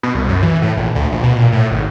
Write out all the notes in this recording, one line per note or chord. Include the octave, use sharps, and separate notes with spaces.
B2
C2
F#2
E3
A2
A#1
D2
A#1
B2
A#2
A2
G#1